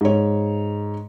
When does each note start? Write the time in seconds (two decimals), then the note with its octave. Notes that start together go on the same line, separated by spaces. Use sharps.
0.01 G#2 C#5